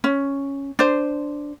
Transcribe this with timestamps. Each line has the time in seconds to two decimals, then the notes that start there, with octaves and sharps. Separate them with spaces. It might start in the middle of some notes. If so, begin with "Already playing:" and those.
0.04 C#4
0.79 D4 C5